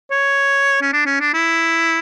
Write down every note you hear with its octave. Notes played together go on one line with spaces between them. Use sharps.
C#5
C#4
D4
C#4
D4
E4